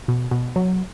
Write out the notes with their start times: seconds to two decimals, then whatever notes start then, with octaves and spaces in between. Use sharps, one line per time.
0.08 B2
0.31 B2
0.56 F#3